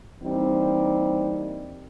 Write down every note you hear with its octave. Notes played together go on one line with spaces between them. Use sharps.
E3 G3 A#3 C4 D4 D#4